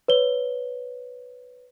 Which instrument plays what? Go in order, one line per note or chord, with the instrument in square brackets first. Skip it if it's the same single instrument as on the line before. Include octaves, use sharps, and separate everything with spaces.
[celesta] B4 C#5 G7